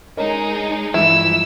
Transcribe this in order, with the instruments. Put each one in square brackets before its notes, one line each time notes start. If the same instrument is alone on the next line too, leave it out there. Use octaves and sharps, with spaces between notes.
[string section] G#3 D#4 G#4 [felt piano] A#4 C#5 D#5
[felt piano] G2 E3 F3 [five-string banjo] E4 [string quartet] E6